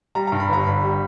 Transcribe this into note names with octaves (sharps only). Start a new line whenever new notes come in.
G3 A#5
G2 A#5
B5
G1 A#5
G1 B5
G3